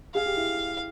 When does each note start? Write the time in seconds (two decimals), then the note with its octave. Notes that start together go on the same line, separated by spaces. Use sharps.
0.15 G#4 F5
0.26 G4
0.37 E4